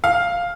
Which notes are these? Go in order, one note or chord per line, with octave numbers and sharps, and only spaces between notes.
F5